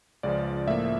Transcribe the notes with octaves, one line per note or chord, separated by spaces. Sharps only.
C#2 C#3 F3 D5
A2 F3 A#3 E5